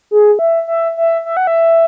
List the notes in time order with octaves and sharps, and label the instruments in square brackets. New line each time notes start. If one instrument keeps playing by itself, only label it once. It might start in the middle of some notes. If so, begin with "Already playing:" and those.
[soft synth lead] G#4
E5
E5
E5
E5
F#5
E5